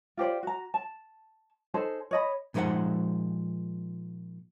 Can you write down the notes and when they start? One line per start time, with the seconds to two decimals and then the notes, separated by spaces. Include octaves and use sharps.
0.17 F4 G4 C5 D5
0.43 F#4 A#5
0.74 A5
1.74 D#4 G#4 A4 C5
2.11 C#5 D#5 B5
2.54 A#2 F3 G#3 D#4 C5 F#5